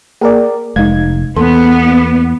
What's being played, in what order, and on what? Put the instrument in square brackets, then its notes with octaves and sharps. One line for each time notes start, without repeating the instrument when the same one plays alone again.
[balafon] A#3 [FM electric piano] G#4 A#4 D5
[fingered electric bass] F1 [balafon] G#3 [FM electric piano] D#4 G#6
[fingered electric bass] E2 [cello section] B3 [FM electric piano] A4 [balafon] C6